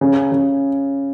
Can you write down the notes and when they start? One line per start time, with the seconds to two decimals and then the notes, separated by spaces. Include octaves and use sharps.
0.01 C#3
0.32 C#3